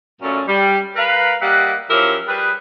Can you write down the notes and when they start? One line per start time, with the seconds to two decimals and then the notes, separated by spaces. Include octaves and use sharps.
0.22 F#2 A#2 A3 C#4
0.48 G3
0.96 A#4 B4 F5
1.42 G3 A#3 D#5 E5 F#5
1.90 F3 F#3 C#4 E4 G4 A#4
2.27 G3 G#4 B4